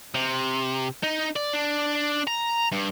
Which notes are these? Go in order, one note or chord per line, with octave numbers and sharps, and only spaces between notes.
C3
D#4
D5
D4
A#5
G2